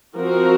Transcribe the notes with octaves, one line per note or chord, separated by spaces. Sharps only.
F3 C4 F#4 A#4